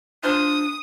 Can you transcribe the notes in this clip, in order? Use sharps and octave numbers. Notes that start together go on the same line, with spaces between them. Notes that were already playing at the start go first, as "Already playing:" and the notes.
D4 F4 C5 D#6